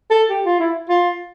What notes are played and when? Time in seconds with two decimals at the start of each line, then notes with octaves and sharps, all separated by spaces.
0.11 A4
0.30 G4
0.46 F4
0.60 E4
0.89 F4